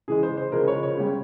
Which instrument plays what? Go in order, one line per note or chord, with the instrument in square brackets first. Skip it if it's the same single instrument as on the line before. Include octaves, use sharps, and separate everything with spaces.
[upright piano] C#3 E3 G#3 G#4
C5
C5
C#3 F3 G#3 A#4
C#5
C#5
C#3 G3